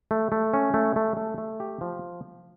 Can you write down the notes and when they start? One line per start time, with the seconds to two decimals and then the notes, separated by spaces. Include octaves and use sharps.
0.11 A3
0.32 A3
0.54 C#4
0.74 A3
0.96 A3
1.17 A3
1.38 A3
1.60 G4
1.81 F3